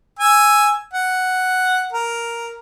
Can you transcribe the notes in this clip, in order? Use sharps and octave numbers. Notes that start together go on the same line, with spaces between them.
G#5 E6
F#5
A#4